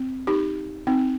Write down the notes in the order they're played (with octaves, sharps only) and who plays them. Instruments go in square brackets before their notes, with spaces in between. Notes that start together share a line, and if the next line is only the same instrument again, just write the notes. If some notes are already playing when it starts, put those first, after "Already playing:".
Already playing: [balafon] C4
D#4 G4
C4 D#4